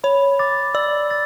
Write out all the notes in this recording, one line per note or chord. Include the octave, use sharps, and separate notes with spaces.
C#5 B5
D6 A6
D5 E6
A6